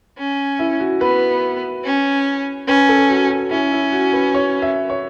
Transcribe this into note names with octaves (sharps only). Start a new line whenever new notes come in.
C#4
E4
F#4
B3 B4
C#4
C#4 B4
A4
F#4
F#4
C#4 E4
E4
F#4
B4
C#5
E5
C#5